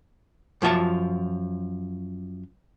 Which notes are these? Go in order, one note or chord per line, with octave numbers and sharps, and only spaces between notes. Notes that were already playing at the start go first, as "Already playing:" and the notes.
F#2 F3 F4 E5 A5